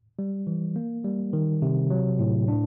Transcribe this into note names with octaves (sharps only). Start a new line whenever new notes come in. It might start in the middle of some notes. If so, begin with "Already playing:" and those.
G3
E3
A#3
G3
D#3
C3
F#3
A2
D4